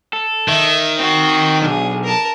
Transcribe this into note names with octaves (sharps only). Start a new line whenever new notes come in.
A4
D#3 E5
C4 F#4
B1 D4 G#4
A#4 A5